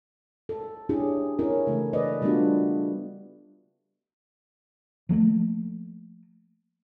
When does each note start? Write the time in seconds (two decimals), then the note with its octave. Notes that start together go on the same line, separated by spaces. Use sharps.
0.49 A4
0.89 C#4 D4 E4 G4 G#4
1.39 C#4 E4 A#4
1.67 C#3 E3 A3
1.93 B4 D5 D#5
2.22 G3 A3 B3 D4 F4 F#4
5.09 F3 F#3 A3 A#3